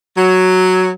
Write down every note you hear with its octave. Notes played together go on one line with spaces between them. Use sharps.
F#3